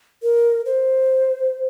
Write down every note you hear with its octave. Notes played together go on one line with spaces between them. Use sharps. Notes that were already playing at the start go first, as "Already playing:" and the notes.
A#4
C5